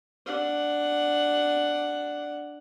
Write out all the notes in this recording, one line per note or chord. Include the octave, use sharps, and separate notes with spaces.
D4 F#5